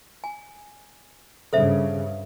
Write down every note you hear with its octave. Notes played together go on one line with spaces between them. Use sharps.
G#5
G2 C#3 A4 C5 E5